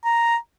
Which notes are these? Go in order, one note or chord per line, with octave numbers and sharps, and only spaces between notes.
A#5